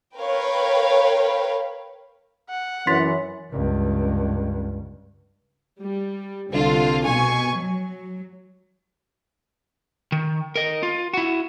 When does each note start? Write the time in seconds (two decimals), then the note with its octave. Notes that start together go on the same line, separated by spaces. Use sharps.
0.18 A#4 B4 C#5 F5 G5 B5
2.49 F#5
2.87 F#2 E3 C#4 C6 A6 B6
3.51 C#2 G2
5.80 G3
6.49 C2 D3 F4
7.04 B2 G#5 C#6
7.53 F#3
10.12 D#3
10.56 A#4 D#5
10.83 F4
11.14 E4 F#4